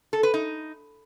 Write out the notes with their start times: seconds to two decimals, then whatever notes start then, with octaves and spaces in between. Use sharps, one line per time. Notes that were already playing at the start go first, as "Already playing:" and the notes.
0.13 A4
0.23 B4
0.34 D#4